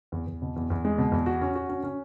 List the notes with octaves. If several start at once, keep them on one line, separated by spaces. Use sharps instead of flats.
E2
E2
B2
E2
E2
G#3
B2
E2
F#4
C#4
F#4
C#4
C#4